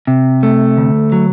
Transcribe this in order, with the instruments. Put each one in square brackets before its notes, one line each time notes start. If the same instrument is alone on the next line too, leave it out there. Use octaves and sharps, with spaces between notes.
[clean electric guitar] C3
A3
D2
F#3